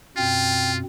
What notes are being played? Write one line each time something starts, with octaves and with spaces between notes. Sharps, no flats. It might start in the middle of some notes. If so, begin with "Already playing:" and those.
F#2 B2 C4 F4 G5